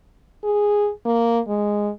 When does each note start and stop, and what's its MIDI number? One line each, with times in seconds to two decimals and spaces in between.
0.43 0.89 68
1.05 1.39 58
1.48 1.90 56